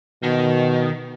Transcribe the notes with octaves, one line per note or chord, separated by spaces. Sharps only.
B2 D#3